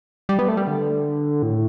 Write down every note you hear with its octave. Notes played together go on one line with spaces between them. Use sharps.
G3
B3
A3
G3
D3
A2